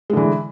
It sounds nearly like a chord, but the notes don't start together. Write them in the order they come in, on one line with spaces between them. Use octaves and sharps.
G#3 D3 E3